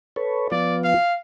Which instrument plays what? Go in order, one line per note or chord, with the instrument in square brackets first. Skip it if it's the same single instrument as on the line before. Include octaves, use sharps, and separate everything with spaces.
[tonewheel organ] A4 B4 C#5
[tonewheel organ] F3 B3 F4 [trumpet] D5
[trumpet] F5